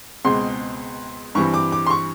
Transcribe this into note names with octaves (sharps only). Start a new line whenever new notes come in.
C#2 B2 G#3 C4 C6
G2 E3 G3 C4 C#6
D6
D6
C6
C#6